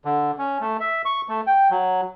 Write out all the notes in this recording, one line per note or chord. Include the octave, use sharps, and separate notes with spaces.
D3
C#4
A3
E5
C#6
A3
G5
F#3